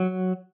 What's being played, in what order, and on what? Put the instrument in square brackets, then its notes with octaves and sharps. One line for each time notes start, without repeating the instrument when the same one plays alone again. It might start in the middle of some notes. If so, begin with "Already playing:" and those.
Already playing: [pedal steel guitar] F#3